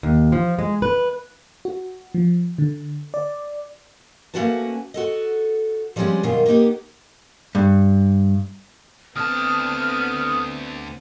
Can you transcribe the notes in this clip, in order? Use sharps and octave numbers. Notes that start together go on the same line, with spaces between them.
D#2
F3
G#3
B4
F#4
F3
D3
D5
A3 A#3 C#4 F#4 B4 A5
F#4 A4 D#5
F3 G3 G#3 C4 C#4
F#2 B2 D#3 G3 F4
A#3 B3 D#4 G4
G2
D2 B3 C4 A5 D#6 F6